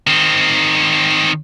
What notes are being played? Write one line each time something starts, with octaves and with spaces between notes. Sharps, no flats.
D#3 C4